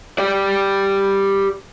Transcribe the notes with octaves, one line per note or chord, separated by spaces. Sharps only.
G4 D5